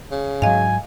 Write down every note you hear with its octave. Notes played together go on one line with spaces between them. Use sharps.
C#3
G#2 F#3 D#5 F5 G#5